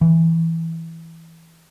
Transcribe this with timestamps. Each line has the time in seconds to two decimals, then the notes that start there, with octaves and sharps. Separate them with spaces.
0.01 E3